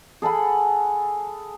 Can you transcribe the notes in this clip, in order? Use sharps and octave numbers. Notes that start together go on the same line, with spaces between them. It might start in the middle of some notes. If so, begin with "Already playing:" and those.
G#4 A4 F#5 B5